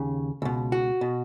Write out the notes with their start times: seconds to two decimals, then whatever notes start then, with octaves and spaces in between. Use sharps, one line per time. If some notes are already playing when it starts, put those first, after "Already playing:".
Already playing: D#2 C#3
0.42 C#2 B2
0.72 F#4
1.01 B2